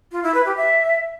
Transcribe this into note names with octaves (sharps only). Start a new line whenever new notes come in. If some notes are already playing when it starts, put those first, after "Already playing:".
F4
E4
B4
G4
E5